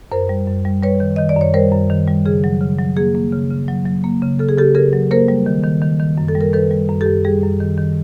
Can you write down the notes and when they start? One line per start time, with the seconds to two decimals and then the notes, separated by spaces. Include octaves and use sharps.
0.12 F#2 A#4 C5
0.29 G3
0.48 F#2
0.65 G3
0.83 G3 B4 C#5
1.00 D#3
1.16 D#3 D#5
1.29 D5
1.36 F#2 C#5
1.54 G3 A#4 C5
1.73 F#2
1.90 D#3
2.07 G3
2.26 C#3 G#4
2.44 F#3
2.61 C#3
2.79 F#3
2.97 A#3 G#4
3.15 A#3
3.33 C#3
3.51 C#3
3.68 F#3
3.86 F#3
4.04 A#3
4.22 C#3
4.39 C#3 A4
4.49 G#4
4.57 C#3 G4 A4
4.75 C#3 G#4 A#4
4.93 F#3
5.11 A#3 A#4 C5
5.28 G3
5.46 D#3
5.64 D#3
5.81 D#3
6.00 D#3
6.18 F#2
6.28 A4
6.35 G3
6.41 A#4
6.53 D#3 A4 B4
6.71 G3
6.89 F#2
7.01 G4 A4
7.07 F#2
7.25 G3 G#4
7.43 F#2
7.60 D#3
7.78 D#3